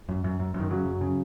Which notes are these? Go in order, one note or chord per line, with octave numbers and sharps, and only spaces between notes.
F#2
F#2
F#2
F#2
D#3
C#3 F#3
F#2
C#3